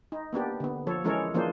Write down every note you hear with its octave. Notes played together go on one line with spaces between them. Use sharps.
D#4
A#3 B3 D4 G4
D3 B3
F3 A4 C#5
E3 G#3 C#4 A4 A#4 C#5
E3 F3 A#3 D4 G#4 C5